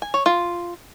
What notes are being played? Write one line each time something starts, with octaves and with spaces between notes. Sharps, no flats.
G#5
C#5
F4